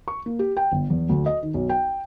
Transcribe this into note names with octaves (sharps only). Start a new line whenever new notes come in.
C#6
A#3
G4
G5
G1
E2
D2
D#5
D#3
B1
G5